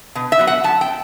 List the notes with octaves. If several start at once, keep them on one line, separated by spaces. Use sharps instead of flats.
B2
E5
F#3 B3
F#5
F#2 A5
G5